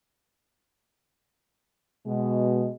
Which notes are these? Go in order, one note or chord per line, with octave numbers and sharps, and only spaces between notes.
B2 G#3